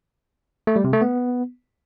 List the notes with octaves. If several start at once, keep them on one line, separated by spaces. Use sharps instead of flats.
A3
G3
C3
A3
B3